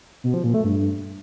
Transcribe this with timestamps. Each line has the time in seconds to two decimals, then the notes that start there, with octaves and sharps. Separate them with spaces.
0.24 B2
0.34 F3
0.44 A#2
0.54 A3
0.64 G2